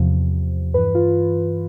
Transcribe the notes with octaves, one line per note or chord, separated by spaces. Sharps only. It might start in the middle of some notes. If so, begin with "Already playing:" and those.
Already playing: E2 C3 F3
G2 E3 B4
F4